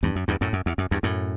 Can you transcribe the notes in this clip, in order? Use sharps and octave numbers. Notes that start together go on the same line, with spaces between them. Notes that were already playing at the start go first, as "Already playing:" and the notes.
E2 G2
F#2
E2 G2
F#2 A2
F#2
E2
F#2
E2 G2
F#2 A2